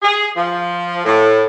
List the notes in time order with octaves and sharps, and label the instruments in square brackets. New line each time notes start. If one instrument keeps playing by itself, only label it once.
[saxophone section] G#4
F3
A2